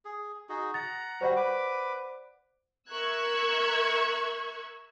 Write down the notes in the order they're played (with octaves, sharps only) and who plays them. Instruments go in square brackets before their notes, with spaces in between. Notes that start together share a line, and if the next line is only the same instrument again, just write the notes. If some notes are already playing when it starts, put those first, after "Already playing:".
[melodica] G#4
D#4 F#4 G#4
[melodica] F#5 A#5 [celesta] A6
[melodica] G3 F#4 [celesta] C5 D5 F#5
[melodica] B4 D6
[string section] A#4 E5 C#6 E6 F#6 G#6